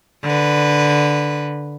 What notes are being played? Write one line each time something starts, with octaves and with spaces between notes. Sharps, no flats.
D3 B4